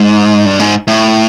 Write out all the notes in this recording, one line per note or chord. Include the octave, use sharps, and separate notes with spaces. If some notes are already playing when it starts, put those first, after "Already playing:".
Already playing: G#2
G2
G#2
A2